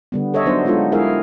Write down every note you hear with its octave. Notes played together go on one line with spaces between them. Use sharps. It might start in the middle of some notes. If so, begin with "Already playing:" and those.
D3 G3 B3
A4 C#5 D#5 E5
F#3 B3 D4 D#4 C5
G#3 B3 D4 D#4 F4 A4
G#3 E4 G#4 A#4 E5 F5